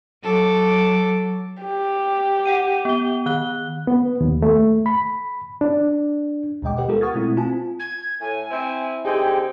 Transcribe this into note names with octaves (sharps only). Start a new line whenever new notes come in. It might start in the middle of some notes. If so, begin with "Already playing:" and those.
F#3 A4 D6
G4
F#5 G5 D#7
B3 G7
D#3 F#6 G7
B3
D#2
A3
B5
D4
D2 B2 G#3 D#5 G5 D6
G4 B4 D#5 F#5 G5
G#3 B3 F4 A4 A#4
F#5 C#6 D#6 F6 G#6 A6
B2 G#3 A3 C4 E4
C4 F4 G#5 A5
G#6
A2 G#5
C4 E4
D3 C4 D#4 G4 G#4 G5